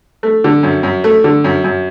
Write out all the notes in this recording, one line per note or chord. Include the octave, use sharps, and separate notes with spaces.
A3
D3
F#2
F#2
A3
D3
F#2
F#2